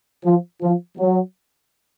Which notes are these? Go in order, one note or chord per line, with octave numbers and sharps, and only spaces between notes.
F3
F3
F#3